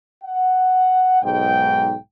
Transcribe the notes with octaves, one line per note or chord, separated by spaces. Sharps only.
F#5
B1 G#2 G5